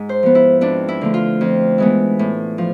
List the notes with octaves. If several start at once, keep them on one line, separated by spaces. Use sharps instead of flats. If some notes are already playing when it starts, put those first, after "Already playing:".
Already playing: G#2
C5
F3 B3
E4
F2 D4
E4
D3 F3 A3
F4
F2
E3 G#3 B3
A2
F3